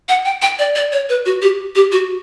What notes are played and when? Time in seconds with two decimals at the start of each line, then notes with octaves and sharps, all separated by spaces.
0.09 F#5
0.25 G5
0.42 G5
0.59 D5
0.75 D5
0.92 C#5
1.09 B4
1.26 F#4
1.42 G4
1.75 G4
1.92 F#4